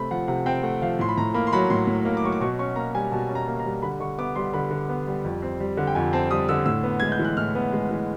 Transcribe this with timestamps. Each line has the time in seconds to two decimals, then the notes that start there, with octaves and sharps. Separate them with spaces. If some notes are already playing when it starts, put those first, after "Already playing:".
Already playing: C3 A3 C4 B5
0.11 F3 F#5
0.28 C3 F#5
0.46 C4 G5
0.63 A3 F#5
0.82 F3 F5
0.99 A2 C6
1.09 B5
1.17 A2 A#5
1.34 A#3 B5
1.47 C6
1.52 F#3 B5
1.70 A2 C6
1.87 A2
2.05 A#3
2.17 D6
2.24 F#3 C#6
2.32 D6
2.41 B2 C#6
2.59 C#4 C#6
2.76 A#3 A#5
2.95 G3 G#5
3.12 B2 A5
3.29 C#4
3.35 A#5
3.47 A#3
3.59 A#5
3.65 G3
3.82 D3 B5
4.00 D3 C#6
4.18 B3 D6
4.35 G3 C6
4.53 D3 B5
4.71 D3
4.89 B3
5.07 G3
5.24 F2
5.42 C4
5.60 G3
5.77 D3
5.87 G5
5.95 F2 G#5
6.13 C4 A5
6.31 G3 D#6
6.49 D3 E6
6.66 A2 E6
6.83 B3
7.00 G#3 G#6
7.12 G6
7.19 E3
7.24 F#6
7.37 A2 F6
7.55 B3
7.73 G#3
7.90 E3